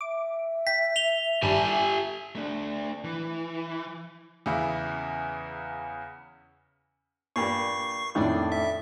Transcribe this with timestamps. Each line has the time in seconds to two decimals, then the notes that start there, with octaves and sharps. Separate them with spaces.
0.01 E5 D6
0.67 G5 B6
0.96 F7 G7
1.43 G#1 G2 G3 G4 G#5 A5
2.35 A3 D4
3.04 E3
4.46 E2 C#3 E3 E4
7.36 G2 A#2 C#6 C7
8.15 F2 A2 D#3 C#4 D4 D5
8.52 E5